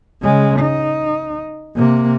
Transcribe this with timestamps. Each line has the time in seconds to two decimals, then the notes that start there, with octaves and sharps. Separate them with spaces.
0.23 C#3 G#3
0.60 D#4
1.76 C3 A#3